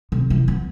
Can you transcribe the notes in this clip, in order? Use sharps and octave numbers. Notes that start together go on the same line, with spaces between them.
C3
E3
B3